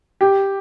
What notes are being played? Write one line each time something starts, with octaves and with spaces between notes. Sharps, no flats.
G4